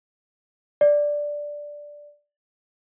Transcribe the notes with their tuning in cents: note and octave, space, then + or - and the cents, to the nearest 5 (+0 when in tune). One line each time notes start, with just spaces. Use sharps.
D5 +0